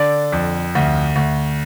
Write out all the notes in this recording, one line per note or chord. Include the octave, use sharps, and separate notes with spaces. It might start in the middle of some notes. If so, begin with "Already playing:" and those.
Already playing: D3 D5
F2
D2
D2